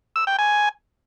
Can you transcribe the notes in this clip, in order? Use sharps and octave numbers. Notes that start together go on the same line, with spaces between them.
E6
G5
G#5